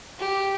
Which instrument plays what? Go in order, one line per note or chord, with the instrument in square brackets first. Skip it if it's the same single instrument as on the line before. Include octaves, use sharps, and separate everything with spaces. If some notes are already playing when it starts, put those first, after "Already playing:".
[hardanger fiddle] G4